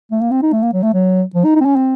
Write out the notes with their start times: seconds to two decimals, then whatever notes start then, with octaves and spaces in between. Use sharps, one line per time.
0.12 A3
0.21 A#3
0.32 C4
0.43 D#4
0.53 A3
0.63 A#3
0.74 F#3
0.83 A3
0.94 F#3
1.35 F3
1.45 D#4
1.56 D#4
1.61 C4
1.66 C#4
1.76 C4